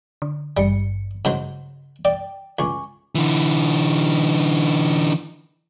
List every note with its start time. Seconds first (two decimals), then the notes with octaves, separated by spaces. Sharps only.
0.22 D3
0.57 G#1 G2 G3 C#7
1.25 G#2 C#3 F#3 C5
2.05 D5 G5
2.59 C#2 G#5 C#6 D6
3.15 D3 E3